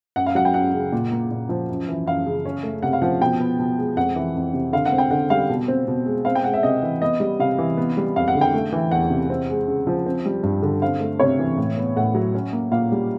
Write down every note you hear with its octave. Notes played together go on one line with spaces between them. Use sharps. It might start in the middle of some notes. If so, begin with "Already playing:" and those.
F#2 F#5
F5
F#3 F#5
G5
F#2 F#5
C#3
A#2
A#3
A#2
F3
F#2
E3
F#2 F5
C#3
C#4
A3
C3 F#5
F5
F3 F#5
B2 G5
B3
B2
G#3
F2 F#5
E3
F2
C3
D3 F5
F#5
C4
G5
D3 F#5
G3 F5
B2
C4
B2
G#3
C4 F5
G5
G#3 F#5
E5
C3 D#5
E3
B3 D#5
G3
C3 F5
E3
B3
G3
F2 F5
F#5
D3
G5
A3
E3
E2 F#5
C3
C4
G#3
C#3
F3
C4
G3
G2
D3
C4 F5
A3
C3 C#5
E3
A2
B3
A2 F#5
F#3
C#4
A#3
A#2 F5
G3